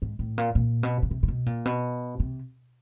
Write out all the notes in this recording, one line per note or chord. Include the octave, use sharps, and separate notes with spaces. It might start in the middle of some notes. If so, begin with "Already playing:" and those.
G#2
A2
A#2
A#2
B2
C#3
C3
C3
B2
A#2
B2
C3